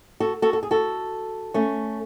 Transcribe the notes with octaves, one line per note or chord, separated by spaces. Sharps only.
F#4 A4
F#4 A4
A4
G#4
F#4 A4
A3 C#4